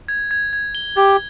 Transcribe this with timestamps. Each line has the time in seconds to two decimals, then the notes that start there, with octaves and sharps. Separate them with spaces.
0.08 G#6
0.31 G#6
0.53 G#6
0.75 G7
0.97 G4 G#6